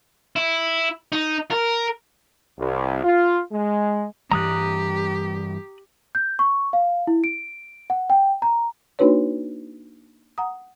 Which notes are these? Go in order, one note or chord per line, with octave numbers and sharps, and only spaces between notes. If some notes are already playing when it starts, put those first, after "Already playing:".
E4
D#4
A#4
C2
F4
G#3
G2 E3 G3 G4 A#5 D#6 F#6
G6
C#6
F5
E4
D7
F#5
G5
A#5
A#3 D4 D#4 F#4 B4 C#5
F#5 A#5 D#6